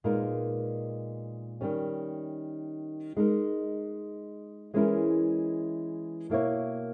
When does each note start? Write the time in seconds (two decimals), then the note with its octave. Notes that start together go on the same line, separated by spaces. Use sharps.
0.04 A#2 G#3 B3 D#4 A#4
1.61 D#3 G3 C#4
3.17 G#3 D#4 A#4
4.74 E3 G#3 C#4 E4 A#4
6.30 B2 A#3 E4 A#4 C#5